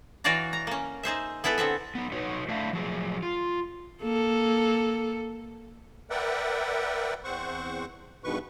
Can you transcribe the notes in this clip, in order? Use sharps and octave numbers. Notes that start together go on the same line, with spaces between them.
E3 F#4 C#5 D5 F5 A#5
A#5
A#3 C#4
D#4 G#4 C5 E5
B3 E4 G#4 A4 B4
D3 B3 C4 E5
B3 D#4
D#4 F#4 B4 C#5
A3 D4 E4 C5 E5 F5
F3 F#3 G#4
F4
A#3 A4
A#4 B4 D5 E5 F#5 G5
E2 C4 C5 F#5 C#6
E2 G2 B2 D#3 B4 C#6